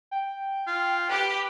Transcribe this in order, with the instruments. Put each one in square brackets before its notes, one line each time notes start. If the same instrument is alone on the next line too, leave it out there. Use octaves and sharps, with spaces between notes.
[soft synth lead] G5
[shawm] F4
[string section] G4 [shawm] B4